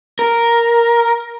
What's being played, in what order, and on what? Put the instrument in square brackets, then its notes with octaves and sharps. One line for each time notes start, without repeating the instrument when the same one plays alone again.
[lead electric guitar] A#4